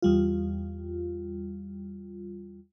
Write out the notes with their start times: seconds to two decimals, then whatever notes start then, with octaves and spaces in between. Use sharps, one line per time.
0.02 E2 G3 F4